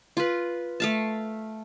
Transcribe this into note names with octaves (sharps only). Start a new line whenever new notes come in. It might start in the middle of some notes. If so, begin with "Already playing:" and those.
F4 B4
A3 F5 A5